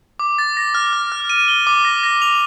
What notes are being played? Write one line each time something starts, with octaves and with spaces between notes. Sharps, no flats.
D6
A6
A#6
F6
F6
F6
D#7
G7
D6
A#6
A#6
F7